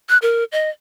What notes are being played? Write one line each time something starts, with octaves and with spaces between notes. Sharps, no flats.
F#6
A#4
D#5